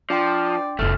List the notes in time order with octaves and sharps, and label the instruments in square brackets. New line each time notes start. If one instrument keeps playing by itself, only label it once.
[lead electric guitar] F3 [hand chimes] D4 G5 C6 [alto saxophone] D5
[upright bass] F1 B3 [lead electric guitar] C2 A3 [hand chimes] F6